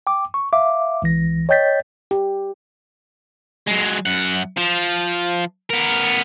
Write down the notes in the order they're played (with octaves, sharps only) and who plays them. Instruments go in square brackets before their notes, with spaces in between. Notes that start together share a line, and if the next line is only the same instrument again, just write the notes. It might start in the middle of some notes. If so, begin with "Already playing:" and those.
[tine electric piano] G5 D6
C#6
E5 F5 D6
C#2 E3 A#6
C#5 D#5 G5 G6 A6 B6
[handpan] G4
[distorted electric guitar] F#3 G#3
F#2 F#5
F3
B3 A#4